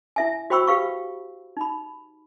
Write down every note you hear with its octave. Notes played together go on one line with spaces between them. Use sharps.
E4 E5 G#5
F#4 C5 G5 B5 C#6 E6
G4 B4 F5 C#6
D#4 B5